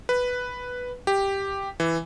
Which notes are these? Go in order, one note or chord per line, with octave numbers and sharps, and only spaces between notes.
B4
G4
E3